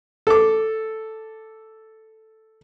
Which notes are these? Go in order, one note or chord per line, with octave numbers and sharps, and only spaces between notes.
A4 D6